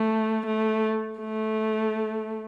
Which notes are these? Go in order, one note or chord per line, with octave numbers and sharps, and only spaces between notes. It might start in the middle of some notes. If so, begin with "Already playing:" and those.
Already playing: A3
A3
A3